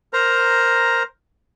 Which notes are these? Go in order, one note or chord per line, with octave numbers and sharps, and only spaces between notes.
A#4 C5 A#5